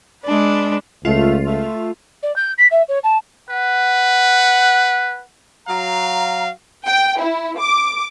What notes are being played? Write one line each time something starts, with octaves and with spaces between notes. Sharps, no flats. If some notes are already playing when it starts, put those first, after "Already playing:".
G#3 D4 B4
C#2 A3 F4
A3
D5
G6
B6
E5
C#5
A5
B4 F#5
F#3 F5 A#5
G5
E4
D6